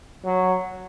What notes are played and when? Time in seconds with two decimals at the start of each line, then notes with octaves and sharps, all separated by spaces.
0.24 F#3